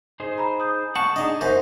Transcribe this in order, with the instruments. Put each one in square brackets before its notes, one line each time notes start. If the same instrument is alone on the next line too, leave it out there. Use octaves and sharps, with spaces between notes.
[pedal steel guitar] D#4 G#4 C5
[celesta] A#5 B5
D#6 G6
[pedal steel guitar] F#5 A5 [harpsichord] C#6
[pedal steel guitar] D4 D#4 G#4 [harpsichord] D#5 A5
[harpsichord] F#2 C5 A5 [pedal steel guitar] D#4 [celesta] E5